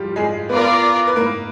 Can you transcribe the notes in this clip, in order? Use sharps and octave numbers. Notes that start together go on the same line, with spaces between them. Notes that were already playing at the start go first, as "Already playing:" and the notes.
Already playing: F3 G3 F4 G4
G#3 G#4
B3 F4 A#4 B4 D5
B4
A#3 A#4